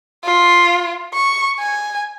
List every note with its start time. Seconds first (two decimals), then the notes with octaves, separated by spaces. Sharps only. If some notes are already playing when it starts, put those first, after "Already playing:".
0.24 F4
1.14 C#6
1.60 G#5